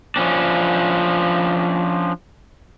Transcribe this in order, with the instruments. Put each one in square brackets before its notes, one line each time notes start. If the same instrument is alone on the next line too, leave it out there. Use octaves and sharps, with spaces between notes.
[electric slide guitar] F3 C#4 D4